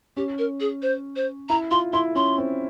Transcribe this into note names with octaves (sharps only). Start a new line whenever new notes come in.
C#4 G4
A#4
G#4
C5
C5
E4 A#5
F4 C6
E4 C6
C#4 C6
C4